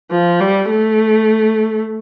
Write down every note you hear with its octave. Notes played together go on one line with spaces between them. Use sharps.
F3
G3
A3